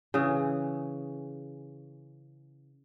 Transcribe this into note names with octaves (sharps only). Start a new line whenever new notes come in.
C#3 E3 G#4